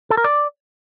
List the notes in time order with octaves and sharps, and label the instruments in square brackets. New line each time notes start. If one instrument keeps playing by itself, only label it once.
[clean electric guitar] A4
A#4
D5